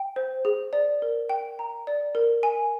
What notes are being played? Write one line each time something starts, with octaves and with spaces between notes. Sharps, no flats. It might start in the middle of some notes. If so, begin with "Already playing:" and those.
Already playing: G5
C5
G#4
D5
A#4
G5
A#5
D5
A#4
G#5